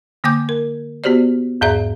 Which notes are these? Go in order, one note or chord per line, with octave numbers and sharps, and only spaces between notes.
D3 A#3 G5 D6 G6
A#4
B3 F#4 G4 C5 D5
E2 G#2 G#4 D5 E5 A#5